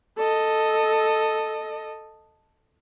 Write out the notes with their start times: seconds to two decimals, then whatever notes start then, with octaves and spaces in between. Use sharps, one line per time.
0.18 A4 D#5